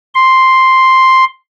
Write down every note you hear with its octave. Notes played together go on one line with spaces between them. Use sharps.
C6